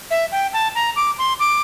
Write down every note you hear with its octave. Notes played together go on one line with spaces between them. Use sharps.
E5
G5
A5
A#5
D6
C6
D6